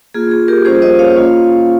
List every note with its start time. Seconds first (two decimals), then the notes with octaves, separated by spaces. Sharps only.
0.14 A#3 F4 G#4
0.31 G#4
0.48 G4 A#4
0.65 G3 A#3 C#4 F4 G#4 C5
0.82 C5 D#5
0.99 C#5 F5
1.16 A#3 C#4 F4